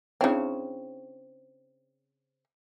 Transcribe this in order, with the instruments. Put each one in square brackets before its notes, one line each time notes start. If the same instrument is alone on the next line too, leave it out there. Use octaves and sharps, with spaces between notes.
[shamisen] C#3 C4 [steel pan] D4 E4 C#5